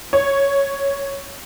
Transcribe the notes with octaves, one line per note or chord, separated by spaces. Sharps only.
C#5